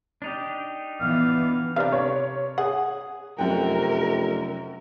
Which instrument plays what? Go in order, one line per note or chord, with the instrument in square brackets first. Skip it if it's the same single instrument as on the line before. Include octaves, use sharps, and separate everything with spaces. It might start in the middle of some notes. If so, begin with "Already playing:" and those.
[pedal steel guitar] D4 D#4 G4
[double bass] E3 B3 [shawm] F5
[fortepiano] C3 D4 B4 [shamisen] D#4 F5
[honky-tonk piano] C#5
[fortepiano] G#4 [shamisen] F#5
[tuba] F1 [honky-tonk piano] F#2 F#5 G5 [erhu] A#4